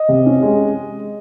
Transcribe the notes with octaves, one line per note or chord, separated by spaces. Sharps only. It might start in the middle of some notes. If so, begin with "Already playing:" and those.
Already playing: D#5
C3
C#4
G#3